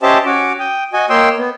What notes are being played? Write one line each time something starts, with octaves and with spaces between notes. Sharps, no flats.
C#4 G4 C5 D#5 E5 A5
C#4 F#4 D6
G5 D#6
F#4 D#5 G#5
A#3 C#5 D#5 G5 C6 E6
B3